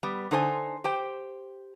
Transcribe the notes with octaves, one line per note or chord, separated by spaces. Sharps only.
G3 B3
D3 D#4 A4 C5 D#5 G#5
G4 C5 G5